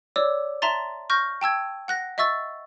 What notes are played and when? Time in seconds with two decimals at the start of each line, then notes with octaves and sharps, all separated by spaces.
0.16 C#5 D5 D6 E6
0.62 E5 A5 A#5 C6 A6
1.10 C#6 F6 G6 A#6
1.41 G5 A5 E6 G#6
1.88 F#5 F#6 A#6
2.18 D#5 E5 C#6 E6 A6